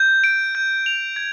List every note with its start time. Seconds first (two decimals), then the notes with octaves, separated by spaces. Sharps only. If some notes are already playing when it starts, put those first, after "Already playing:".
Already playing: G6
0.24 D7
0.55 G6
0.86 F7
1.16 G#6